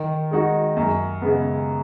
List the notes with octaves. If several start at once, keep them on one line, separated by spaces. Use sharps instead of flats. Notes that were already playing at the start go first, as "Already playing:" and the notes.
Already playing: D#3
G#3 D#4 F#4
F#2
C#3 G#3 B3